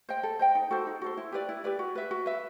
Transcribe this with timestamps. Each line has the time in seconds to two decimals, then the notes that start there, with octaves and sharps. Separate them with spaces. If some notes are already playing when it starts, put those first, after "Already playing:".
0.09 C5 D#5 G5
0.23 A4
0.39 C5 D#5 G5
0.55 D#4
0.71 F#4 A4 C5
0.87 D#4
1.02 F#4 A4 C5
1.17 E4
1.32 G4 B4 D5
1.49 E4
1.64 G4 B4 D5
1.79 F#4
1.95 B4 E5
2.11 F#4
2.26 B4 E5